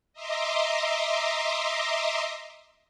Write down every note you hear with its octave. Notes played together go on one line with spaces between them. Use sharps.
D#5 E5 A#5 C6 D6